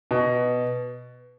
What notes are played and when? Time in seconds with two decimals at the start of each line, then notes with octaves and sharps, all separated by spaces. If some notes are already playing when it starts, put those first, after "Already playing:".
0.11 B2